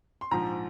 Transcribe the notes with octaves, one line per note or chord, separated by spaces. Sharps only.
C6
A#1 G#2 F3 A#5